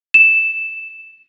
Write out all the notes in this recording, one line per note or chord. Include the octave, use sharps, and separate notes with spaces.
E7